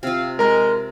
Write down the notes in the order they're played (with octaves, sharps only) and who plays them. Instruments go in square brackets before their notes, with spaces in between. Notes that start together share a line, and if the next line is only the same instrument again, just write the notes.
[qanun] C3 F4 [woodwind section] C4 F5
[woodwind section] G#3 [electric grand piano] A#4 A#5